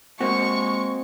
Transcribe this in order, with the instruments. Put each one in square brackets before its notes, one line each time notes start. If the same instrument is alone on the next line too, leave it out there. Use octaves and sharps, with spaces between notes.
[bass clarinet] G#3 [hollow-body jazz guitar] A#3 C4 F#4 [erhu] C#6